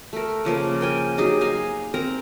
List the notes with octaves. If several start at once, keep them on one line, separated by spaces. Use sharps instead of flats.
A3 A#4
C#3 F3 A#3
A#4 G5 G#5
F#3 D#4 G4 G#4
D#5 F5 G#5
C4 A#4 A#5